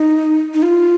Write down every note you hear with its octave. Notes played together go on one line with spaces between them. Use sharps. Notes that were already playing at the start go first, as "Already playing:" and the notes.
Already playing: D#4
D#4
F4